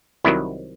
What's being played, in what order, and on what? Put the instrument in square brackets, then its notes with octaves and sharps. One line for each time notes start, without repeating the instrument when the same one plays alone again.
[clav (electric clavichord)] C2 C3 D#3 F#3 E4